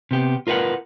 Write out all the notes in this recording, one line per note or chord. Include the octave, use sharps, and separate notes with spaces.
C3 B3 G4
F4 A#4 B4 F5 F#5